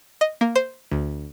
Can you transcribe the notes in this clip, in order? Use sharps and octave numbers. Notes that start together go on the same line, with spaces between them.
D#5
A#3
C5
D2